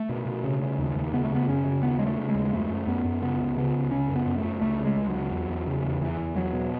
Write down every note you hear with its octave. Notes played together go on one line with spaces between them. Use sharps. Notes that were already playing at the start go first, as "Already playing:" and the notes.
Already playing: A3
B2
B2
C#3
C#3
D#2
D#2
C#3 B3
A3
C#3 B3
F#2 C#4
C#3
D#2 B3
C#3 G#3
A3
C#3
G#3
D#2
F#2 A3
F#2
F#2 B3
F#2
C#3 B3
C#2
C#3 B3
C#2
C#3 C#4
F#2
B3
F#2
A3
F#2
C#2 A3
C#3
G#3
C#2
F#3
C#2
E2
E2
C#3
E2
E2 E3
E2
E2 F#3
B2